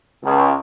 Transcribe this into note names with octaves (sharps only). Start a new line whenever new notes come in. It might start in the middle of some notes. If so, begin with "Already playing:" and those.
C#2